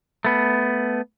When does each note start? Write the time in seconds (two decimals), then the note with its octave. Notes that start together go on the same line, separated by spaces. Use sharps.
0.25 A3 B3